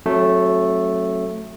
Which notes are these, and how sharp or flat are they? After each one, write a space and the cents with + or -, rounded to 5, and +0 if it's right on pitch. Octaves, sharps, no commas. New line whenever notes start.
F#3 +0 A3 +0 C#4 -45